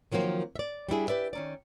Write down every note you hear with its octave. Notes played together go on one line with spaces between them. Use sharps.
D#3 F3 F#3 A#3 C4
D5 E5
G3 D4 E4 G#4
G4 B4 D5 E5
D#3 C#4 D5